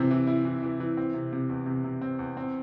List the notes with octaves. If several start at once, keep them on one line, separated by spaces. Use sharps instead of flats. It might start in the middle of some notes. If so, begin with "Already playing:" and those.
Already playing: C3 E3 C4
E3
E4
E3
E3
E3
C4
C3
C3
E2
C3
C3
C4
E2
C4